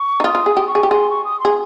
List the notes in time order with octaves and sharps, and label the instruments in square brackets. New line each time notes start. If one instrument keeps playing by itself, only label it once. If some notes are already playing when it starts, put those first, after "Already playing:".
Already playing: [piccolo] C#6
[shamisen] D#4
[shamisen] F4 [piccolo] D#6
[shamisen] F4
G#4
G4
[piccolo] C#6
[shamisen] G#4
G4
[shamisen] G#4 [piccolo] C6
[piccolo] C#6
D#6
[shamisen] G#4 [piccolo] C6